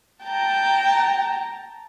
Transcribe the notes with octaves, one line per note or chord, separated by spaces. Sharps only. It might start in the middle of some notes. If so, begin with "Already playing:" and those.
G5 A5 A#5